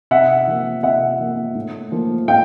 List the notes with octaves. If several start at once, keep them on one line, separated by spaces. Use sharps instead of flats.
C3 E5 F#5
F3 A#3
C3 E5 F#5
F3 A#3
A2
F3 A#3
A2 F5 G5